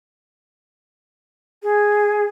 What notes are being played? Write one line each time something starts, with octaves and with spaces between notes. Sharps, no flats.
G#4